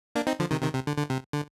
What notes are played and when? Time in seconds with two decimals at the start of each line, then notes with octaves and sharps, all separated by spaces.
0.15 A#3 D4
0.27 C4 D#4
0.39 D3 F3
0.51 C3 D#3
0.63 C3 D#3
0.74 C3
0.87 D3
0.98 D3
1.10 C3
1.33 D3